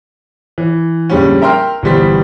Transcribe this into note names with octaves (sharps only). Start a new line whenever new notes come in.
E3
F2 A#2 D3 G3 G#3 C#4
A#4 E5 G5 A#5 C6 F6
G1 B2 E3 G3 C5 B6